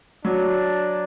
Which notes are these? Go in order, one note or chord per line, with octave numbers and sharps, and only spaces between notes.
F#3 D4